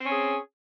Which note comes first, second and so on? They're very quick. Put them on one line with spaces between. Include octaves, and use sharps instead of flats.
C4 C#4 C#5 G#4